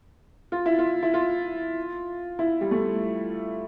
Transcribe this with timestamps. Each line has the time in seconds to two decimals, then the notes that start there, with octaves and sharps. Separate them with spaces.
0.52 F4
0.66 E4
0.79 F4
1.03 E4
1.14 F4
2.39 E4
2.61 G3
2.71 A3